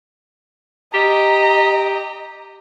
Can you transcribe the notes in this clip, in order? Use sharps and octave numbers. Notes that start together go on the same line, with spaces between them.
G4 D#5 A#5